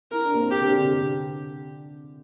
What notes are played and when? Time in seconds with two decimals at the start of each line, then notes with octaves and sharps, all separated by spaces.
0.11 E4 A#4
0.25 D4
0.34 A#3
0.38 C4
0.51 C4 G4
0.61 D3
0.71 D3
0.80 C3
0.91 D3